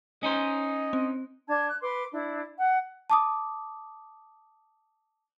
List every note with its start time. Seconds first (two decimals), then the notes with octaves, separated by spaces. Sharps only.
0.23 C#4 D#4 C5 D#5
0.93 C4
1.48 D4 A5 G#6
1.68 F#6
1.81 B4 C6 D6
2.12 D4 E4
2.57 F#5
3.10 A5 D6 D#6